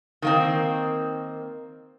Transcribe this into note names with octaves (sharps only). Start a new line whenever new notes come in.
D#3 A#3 C4